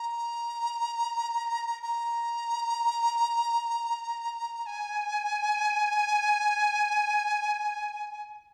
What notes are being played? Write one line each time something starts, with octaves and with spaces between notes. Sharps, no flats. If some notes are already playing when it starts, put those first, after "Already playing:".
Already playing: A#5
A#5
G#5